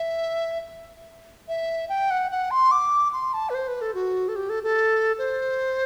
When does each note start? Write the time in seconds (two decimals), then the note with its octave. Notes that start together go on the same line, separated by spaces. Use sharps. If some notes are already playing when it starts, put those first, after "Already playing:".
Already playing: E5
1.48 E5
1.89 G5
2.11 F#5
2.31 F#5
2.51 C6
2.71 D6
3.13 C6
3.34 A5
3.50 B4
3.55 C5
3.68 B4
3.81 A4
3.94 F#4
4.28 A4
4.36 G4
4.49 A4
4.63 A4
5.18 C5